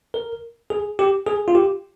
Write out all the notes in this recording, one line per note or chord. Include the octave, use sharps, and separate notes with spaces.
A#4
G#4
G4
G#4
F4
G4